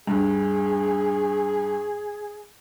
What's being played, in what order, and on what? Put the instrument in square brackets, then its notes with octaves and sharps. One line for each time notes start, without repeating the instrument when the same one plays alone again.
[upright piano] G2 [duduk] G#4